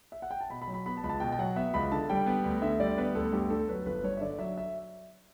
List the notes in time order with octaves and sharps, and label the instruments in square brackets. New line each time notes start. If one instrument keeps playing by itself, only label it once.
[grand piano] E5
F#5
G5
A5
B2 B5
B5
F#3
B5
B3 B5
A5
C#2 B5
A5
B2 G5
G5
F#3 F#5
B3 E5
C#2 B5
D3 A5
G3 G5
B3
D2
D3 E5
G3 D5
B3 B4
D2 A4
G2 G4
D3 A4
F#3 B4
G1 B4
G2 C#5
E5
D3 D5
F#3 E5
E5